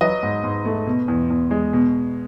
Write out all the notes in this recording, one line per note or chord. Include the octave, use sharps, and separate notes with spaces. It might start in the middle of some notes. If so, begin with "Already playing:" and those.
F#3 B4 D#5
G#2
G#2
A3
B2
E2
E2
G#3
B2